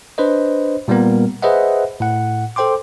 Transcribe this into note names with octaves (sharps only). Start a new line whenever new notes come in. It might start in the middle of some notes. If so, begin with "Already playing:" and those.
D4 B4 C5 D#5
A#2 G3 A#3 B3 A#4
G#4 B4 C5 D#5 E5 F#5
A2 F#5
A4 C5 G5 C6 D6